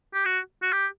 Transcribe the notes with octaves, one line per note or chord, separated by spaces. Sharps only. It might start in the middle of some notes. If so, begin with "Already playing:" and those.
G4
F#4
F#4
G4